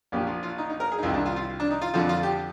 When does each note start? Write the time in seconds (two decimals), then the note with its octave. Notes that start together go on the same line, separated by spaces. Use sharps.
0.12 A#1 A#2 F3 G4
0.27 F4
0.43 F4
0.58 D#4
0.70 D#4
0.80 A#4
0.92 G#4
0.98 D#4
1.03 C2 C3 D#3 F4
1.14 D4
1.26 F4
1.36 F4
1.60 D4
1.71 D#4
1.82 F4
1.94 F2 D3 F3 F4
2.09 F4
2.23 G4